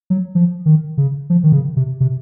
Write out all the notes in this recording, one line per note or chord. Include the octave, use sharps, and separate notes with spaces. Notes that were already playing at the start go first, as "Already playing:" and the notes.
F#3
F3
D#3
C#3
F3
D#3
C#3
C3
C3